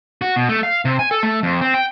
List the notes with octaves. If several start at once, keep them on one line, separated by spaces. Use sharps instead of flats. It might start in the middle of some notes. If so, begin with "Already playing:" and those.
F#4
B2
A3
F5
C3
G#5
A4
A3
F2
C4
G5